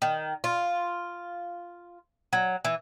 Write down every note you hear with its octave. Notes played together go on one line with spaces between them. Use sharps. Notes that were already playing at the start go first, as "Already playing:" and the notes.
D#3
F4
F#3
E3